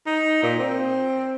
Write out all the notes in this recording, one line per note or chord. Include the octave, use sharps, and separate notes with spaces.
D#4
A#2
C4